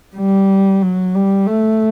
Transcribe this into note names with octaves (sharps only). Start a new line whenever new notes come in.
G3
F#3
G3
A3